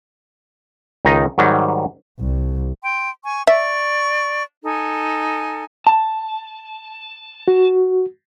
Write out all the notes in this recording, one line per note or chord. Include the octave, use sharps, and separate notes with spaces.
C#2 D#3 D#4 D#5 A#5
G#2 D#3 F#3 G3
C2
G5 C6
G#5 C#6
D5 E5 C#6
D#4 A4 G#5
A5
F#4